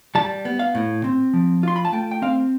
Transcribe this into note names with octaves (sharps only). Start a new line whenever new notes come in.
G3 A5
B3
F5
A2
C4
F3
F4 C6
B5
A5
A3 G5
G5
C4 F5